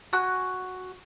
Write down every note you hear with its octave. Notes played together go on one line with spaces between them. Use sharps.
F#4 G#5 F#6